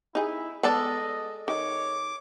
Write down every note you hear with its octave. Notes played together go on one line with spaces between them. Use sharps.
D#4 E4 G#4
G#3 B3 A4 D5 D#5
D#3 C#5 D6